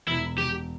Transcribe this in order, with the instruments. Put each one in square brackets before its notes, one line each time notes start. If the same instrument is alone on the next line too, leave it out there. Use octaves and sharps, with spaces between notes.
[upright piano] E1 [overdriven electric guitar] E4
[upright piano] E1 [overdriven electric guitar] G4